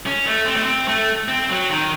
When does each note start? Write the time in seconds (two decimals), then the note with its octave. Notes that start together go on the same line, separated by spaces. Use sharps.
0.06 C#4
0.26 A3
0.47 C4
0.56 A3
0.64 C4
0.88 A3
1.28 C4
1.49 F#3
1.70 D#3